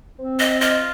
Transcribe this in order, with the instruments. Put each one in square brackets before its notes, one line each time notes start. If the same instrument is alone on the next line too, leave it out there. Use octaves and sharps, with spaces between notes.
[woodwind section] C4
[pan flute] D#5
[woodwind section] F4 [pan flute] D#5